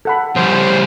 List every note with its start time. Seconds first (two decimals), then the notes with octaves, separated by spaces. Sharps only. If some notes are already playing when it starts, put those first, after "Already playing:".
0.05 A4 F#5 B5
0.36 C#3 F3 G3 C#4 C5